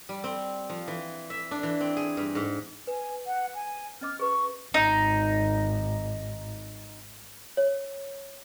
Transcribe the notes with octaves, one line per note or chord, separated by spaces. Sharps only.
G3
C4
F3
E3
E5
D4
E3
C4
G#4
G2
G#2
B4 G#5
F#5
G#5
C#4 D#5 D6 F6
G#4 B4 C#6
G#1 D#4
C#5